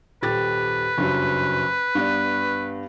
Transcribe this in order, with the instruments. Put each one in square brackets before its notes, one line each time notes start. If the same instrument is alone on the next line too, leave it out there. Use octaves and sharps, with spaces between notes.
[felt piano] D#1 G4 A6 [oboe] B4
[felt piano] F#1 G2 F#3
G2 B3 D5